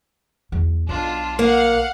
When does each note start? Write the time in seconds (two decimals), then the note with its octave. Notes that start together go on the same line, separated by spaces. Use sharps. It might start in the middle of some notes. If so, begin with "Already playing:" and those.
0.52 E2 F#3
0.89 B1 D4 F4
1.39 A#3 F5 F#5